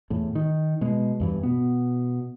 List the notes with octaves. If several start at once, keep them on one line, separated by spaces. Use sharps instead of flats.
E2 A2
D#3
B2 G#3
E2 G2 E3
B2 B3